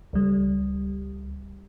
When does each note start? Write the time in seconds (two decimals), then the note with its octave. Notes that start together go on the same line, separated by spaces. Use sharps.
0.13 C#2 G3